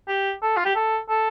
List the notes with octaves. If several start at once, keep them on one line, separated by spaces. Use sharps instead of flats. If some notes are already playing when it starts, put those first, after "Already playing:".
G4
A4
F4
G4
A4
A4